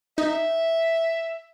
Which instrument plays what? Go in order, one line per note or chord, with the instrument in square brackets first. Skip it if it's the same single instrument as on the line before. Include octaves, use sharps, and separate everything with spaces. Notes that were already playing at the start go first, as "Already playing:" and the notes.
[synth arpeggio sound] D#4 [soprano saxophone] E5